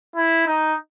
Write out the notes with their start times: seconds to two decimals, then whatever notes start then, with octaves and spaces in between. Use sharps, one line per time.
0.16 E4
0.47 D#4